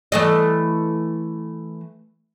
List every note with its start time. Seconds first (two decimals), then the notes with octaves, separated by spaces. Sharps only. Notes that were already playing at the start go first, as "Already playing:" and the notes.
0.12 E3 A3 D#5